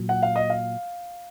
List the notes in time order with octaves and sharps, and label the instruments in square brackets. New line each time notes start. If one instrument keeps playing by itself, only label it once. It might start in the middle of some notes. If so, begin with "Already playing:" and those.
Already playing: [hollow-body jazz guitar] A#2 F#3
[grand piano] F#5
F5
D#5
F5